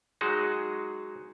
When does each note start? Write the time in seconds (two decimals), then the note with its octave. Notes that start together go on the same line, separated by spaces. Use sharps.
0.21 F#3 G#3 D#4 F#4 G#4